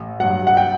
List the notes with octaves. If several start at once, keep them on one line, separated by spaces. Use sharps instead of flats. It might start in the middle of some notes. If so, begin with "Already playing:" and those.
Already playing: A1
G2 F#3 F#5
F#5
G5